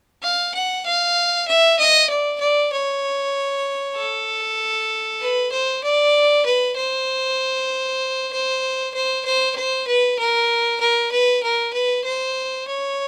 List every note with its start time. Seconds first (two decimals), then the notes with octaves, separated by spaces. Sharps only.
0.23 F5
0.54 F#5
0.85 F5
1.48 E5
1.79 D#5
2.09 D5
2.40 D5
2.73 C#5
3.96 A4
5.21 B4
5.52 C5
5.83 D5
6.45 B4
6.76 C5
8.32 C5
8.94 C5
9.25 C5
9.55 C5
9.87 B4
10.19 A#4
10.81 A#4
11.11 B4
11.43 A#4
11.73 B4
12.04 C5
12.67 C#5